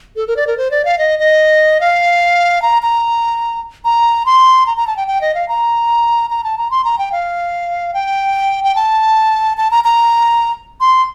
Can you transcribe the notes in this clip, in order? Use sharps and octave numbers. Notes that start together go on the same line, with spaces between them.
A4
A#4
D5
A#4
C5
D5
F5
D#5
D#5
F5
A#5
A#5
A#5
C6
A#5
A#5
A5
G5
G5
D#5
F5
A#5
A#5
A5
A#5
C6
A#5
G5
F5
G5
G5
A5
A5
A#5
A#5
C6